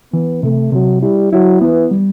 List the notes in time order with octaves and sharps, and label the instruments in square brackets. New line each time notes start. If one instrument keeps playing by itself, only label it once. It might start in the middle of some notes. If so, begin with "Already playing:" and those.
[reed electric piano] E3 [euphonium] B3
[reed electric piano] C3 [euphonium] A3
[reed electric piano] C3 [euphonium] F#3
[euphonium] G3 [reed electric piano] E4
[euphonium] F#3 [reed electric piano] E4
[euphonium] E3 [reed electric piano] B3
[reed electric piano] G3